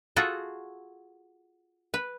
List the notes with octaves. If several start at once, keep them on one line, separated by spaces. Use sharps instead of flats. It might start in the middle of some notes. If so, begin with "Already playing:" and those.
F4 F#4 G#4 A4
B4